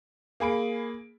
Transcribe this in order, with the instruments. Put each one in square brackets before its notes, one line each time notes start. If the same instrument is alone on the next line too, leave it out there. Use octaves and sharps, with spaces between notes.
[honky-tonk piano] A#3 G#4 B5 D7